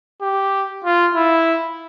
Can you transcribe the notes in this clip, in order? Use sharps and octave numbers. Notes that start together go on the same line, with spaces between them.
G4
F4
E4